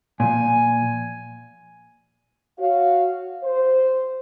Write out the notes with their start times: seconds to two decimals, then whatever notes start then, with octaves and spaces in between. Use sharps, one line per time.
0.20 A#2 F3 G#5
2.59 F#4 C#5 F5
3.43 C5